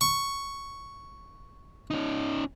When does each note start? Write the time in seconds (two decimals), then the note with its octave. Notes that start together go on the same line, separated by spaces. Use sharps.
0.01 C#6
1.91 C#4 D#4